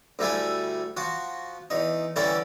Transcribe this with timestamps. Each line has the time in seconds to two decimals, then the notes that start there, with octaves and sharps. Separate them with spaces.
0.19 D2 G3 A3 E4 G#5
0.97 F3 F#4
1.70 E2 D#4
2.16 D3 E3 G3 C#4 E4 D5